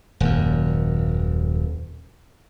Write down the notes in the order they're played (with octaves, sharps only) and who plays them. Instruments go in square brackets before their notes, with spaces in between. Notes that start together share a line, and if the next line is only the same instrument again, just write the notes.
[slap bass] D#1 F#2